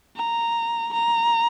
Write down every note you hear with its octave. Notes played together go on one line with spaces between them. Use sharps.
A#5
A#5